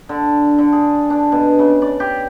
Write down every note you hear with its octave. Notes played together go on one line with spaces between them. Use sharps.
D3
D3
G#4
D4
B2
C#3
D5
G4